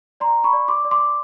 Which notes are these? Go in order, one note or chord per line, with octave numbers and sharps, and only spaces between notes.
D5 A#5 C6
B5 C#6
D5
C6 D6
D5
C6 D6